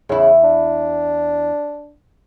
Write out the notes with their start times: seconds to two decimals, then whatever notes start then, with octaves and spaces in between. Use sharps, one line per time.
0.09 E2 C#3 E4
0.44 D4